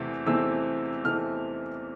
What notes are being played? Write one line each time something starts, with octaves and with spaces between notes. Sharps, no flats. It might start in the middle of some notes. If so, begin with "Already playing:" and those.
Already playing: E2 C3 E3 A3 C4
E2 C3 E3 A3 C4 E6
E2 C3 E3 A3 C4 F6